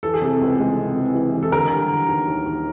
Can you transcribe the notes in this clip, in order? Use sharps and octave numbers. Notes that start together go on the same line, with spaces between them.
E3 A4
G#4
C3 A4
C#2
G#3
C3
E3
E3
E3
A4
D3 A#4
G3
D3
D#2
D#2
D#2